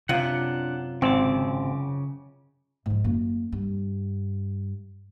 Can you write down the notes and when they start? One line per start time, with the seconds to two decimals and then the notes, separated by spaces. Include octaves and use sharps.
0.09 F#2 C3 D4 F4 F#5
1.02 G#1 C#3 C4 D6
2.86 G#2 F3
3.04 F#2 A#3
3.52 G2